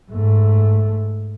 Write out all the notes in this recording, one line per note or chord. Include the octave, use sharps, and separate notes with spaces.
G#2 A3